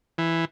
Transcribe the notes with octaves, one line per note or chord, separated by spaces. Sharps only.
E3